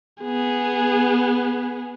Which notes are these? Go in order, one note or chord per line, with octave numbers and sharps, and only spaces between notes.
B3 G#4